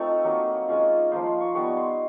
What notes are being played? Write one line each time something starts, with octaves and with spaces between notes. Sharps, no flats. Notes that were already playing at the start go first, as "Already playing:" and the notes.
Already playing: A3 C4 D#4 F4 C#6
F#3 A#3 D#4
G#3 C#4 F4
F3 A#3 D#4 C6
C6
C#6
G3 B3 D#4 C#6
C6